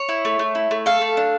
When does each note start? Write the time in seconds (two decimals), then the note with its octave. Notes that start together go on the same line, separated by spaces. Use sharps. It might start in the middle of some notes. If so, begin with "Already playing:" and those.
Already playing: C#5
0.09 E4
0.25 A3
0.39 A3
0.55 E4
0.71 A3
0.86 A4 F5
1.01 A3
1.17 D4